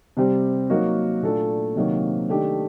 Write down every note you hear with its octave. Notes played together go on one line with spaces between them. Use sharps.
C3 G3 C4 G4 C5
F#3 A#3 D#4 F#4 A#4
A#2 A3 D4 A4
C3 D#3 F#3 A#3
D#3 A3 D4 G4